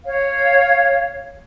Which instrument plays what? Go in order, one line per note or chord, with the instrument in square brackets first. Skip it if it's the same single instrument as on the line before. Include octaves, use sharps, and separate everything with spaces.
[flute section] C#5 F5